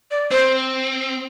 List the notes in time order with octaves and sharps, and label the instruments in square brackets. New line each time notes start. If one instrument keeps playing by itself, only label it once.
[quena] D5
[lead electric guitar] C4 [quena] C5